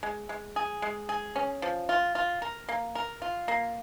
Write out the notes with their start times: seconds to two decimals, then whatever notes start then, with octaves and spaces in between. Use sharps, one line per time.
0.03 G#3
0.29 G#3
0.56 G#4
0.82 G#3
1.09 G#4
1.36 C#4
1.62 F3
1.89 F4
2.15 F4
2.42 A#4
2.69 A#3
2.95 A#4
3.22 F4
3.48 A#3